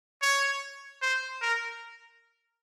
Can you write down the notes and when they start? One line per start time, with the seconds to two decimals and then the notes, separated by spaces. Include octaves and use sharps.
0.22 C#5
1.02 C5
1.42 A#4